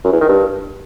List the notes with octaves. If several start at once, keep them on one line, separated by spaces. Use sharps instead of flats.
F#2
E2
D#3
G2